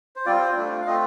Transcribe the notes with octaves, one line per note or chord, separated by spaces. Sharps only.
C5
G3 C4 F4 D5
C5
A3 D4 F4
F5
A3 C4 F4 D#5